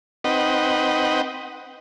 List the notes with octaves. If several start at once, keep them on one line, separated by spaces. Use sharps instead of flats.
C4 D#4 B4 D#5 F#5 G5